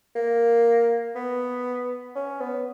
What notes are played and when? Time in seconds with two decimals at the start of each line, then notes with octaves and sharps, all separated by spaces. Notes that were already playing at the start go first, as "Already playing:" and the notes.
0.16 A#3
1.15 B3
2.15 C#4
2.40 B3